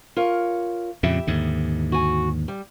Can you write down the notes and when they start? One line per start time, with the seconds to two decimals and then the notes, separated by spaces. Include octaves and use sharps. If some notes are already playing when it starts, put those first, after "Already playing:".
0.16 F4 A#4 C#5
1.03 F2 A#2 C#3 E4 G4 E5
1.27 D#2 G#2 D3
1.92 F#4 G#5
2.48 G3